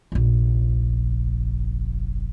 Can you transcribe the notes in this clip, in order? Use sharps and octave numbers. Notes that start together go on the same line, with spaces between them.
F1 A#1